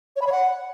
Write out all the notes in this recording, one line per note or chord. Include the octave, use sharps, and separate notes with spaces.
C#5
B5
C#5
F#5